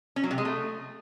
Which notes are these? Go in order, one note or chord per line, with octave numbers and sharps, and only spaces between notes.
C#4
F#3
C3
G#3
A3